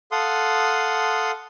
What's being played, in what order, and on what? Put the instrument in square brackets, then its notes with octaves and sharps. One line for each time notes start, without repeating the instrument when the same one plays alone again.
[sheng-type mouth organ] A4 F5 F#5 C6 D#6